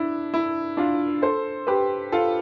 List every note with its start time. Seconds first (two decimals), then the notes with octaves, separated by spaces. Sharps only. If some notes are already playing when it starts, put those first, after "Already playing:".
Already playing: D4 E4
0.34 E4
0.77 D4 F4
1.22 A4 C5
1.67 G4 B4
2.12 F4 A4